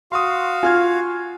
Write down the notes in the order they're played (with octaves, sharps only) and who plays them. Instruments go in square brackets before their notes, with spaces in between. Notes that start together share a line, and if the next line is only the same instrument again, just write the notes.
[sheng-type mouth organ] F#4 F5 [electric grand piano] C6 D#6
[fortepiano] F4 [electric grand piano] G#5 F6 G#6